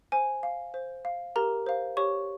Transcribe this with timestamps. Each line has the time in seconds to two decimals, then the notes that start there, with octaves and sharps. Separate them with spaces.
0.12 C5 G#5
0.43 F5
0.74 C5
1.05 F5
1.36 G4 A#4 A#5
1.66 C5 F5
1.97 G4 C#5 C#6